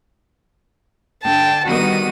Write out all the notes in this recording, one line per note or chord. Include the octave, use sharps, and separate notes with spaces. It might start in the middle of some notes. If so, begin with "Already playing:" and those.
D3 G5 A5
D#3 G3 B3 F#4 D#7